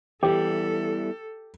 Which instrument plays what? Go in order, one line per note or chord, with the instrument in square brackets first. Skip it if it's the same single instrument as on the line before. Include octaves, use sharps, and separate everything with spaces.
[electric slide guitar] E2 E3 G3 [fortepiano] G4 [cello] A4